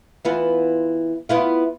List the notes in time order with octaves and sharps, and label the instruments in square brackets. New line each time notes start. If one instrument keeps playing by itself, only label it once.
[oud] E3 B3 F4
B3 E4 F4